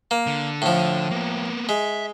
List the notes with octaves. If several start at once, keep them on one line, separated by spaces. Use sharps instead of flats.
A#3
D3
A2 F3
A#3 B3
G#3 E5